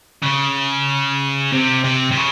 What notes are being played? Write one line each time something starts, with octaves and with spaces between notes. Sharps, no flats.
C#3
C3
C3
C3
C#3